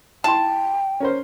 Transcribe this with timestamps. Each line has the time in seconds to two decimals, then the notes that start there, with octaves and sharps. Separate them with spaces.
0.24 E4 G5 A5 C6
1.00 C#4 A#4 C5